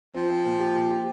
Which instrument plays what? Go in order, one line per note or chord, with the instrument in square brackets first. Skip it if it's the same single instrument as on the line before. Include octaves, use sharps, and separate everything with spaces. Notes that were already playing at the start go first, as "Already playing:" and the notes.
[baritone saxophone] F3 [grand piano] C4
[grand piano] C4
A#2
G4
A#2
G4